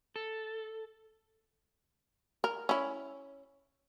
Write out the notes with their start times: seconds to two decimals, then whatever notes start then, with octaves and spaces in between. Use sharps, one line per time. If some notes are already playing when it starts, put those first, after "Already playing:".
0.16 A4
2.44 A#4
2.69 C#4 E4